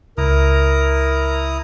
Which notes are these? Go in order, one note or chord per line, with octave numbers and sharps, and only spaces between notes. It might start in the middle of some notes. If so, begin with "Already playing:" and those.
C#2 E4 A#4 A#5 D#6